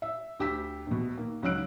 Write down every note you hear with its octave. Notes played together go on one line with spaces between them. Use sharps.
E5
D2 G4 G5 E6 B6
A#1 B2
D#3 A#3
C#2 F#3 D#4 E6 F#6 D7